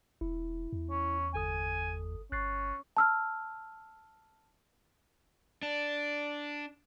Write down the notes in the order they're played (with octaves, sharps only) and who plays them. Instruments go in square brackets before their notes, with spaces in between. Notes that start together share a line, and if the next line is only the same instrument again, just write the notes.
[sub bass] E1 [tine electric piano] E4
[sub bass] E2
[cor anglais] C#4
[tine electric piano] G1 A4 D#6 [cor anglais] G#5
[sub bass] G1 [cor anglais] C#4 [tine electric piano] F#6 A6 C7
[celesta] A5 E6 F6
[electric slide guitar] D4